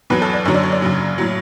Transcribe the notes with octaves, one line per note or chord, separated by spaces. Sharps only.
E2 B2 F#3 B4
A4
D5
F#2 D3 F#3 C#5
D5
C#5
D5
F#2 C#3 F#3
A2 F#3